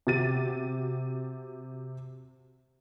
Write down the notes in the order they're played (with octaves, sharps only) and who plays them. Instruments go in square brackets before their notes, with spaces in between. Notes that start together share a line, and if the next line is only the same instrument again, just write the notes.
[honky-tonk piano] C3 F#4 A6 D#7